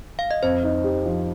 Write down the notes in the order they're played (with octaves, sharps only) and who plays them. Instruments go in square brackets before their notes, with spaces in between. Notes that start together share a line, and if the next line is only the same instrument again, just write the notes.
[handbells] F5
D#5
[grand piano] F2 [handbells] C5
[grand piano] D#4
G4
F3